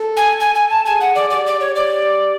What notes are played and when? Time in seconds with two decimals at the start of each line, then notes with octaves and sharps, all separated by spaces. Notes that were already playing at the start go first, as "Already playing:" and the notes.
Already playing: A4
0.17 G#5
0.40 G#5
0.55 G#5
0.70 A5
0.85 G#4 G#5
1.01 F#5
1.15 D5
1.30 G4 D5
1.46 D5
1.61 C#5
1.75 D5